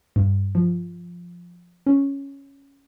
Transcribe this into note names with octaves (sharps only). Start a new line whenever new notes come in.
G2
F3
C#4